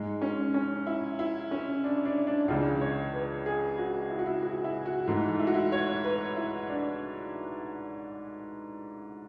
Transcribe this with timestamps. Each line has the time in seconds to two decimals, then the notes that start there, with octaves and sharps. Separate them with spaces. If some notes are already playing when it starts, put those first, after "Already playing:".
Already playing: G#2 G#3
0.22 C#4
0.54 C#4
0.87 E4
1.19 E4
1.51 C#4
1.84 D4
2.05 D4
2.27 D4
2.48 C#2 C#3 E3 D4
2.81 C#5
3.13 B4
3.46 G#4
3.78 F#4
4.10 E4
4.19 F#4
4.26 E4
4.43 F#4
4.64 E4
4.86 F#4
5.08 G#2 E3 A3
5.39 E4
5.47 F#4
5.54 E4
5.72 C#5
6.04 B4
6.37 E4
6.69 D4